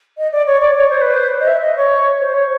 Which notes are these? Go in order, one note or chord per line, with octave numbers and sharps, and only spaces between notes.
D#5
D5
C#5
D5
C#5
C5
B4
C5
D#5
E5
D#5
C#5
C5
C#5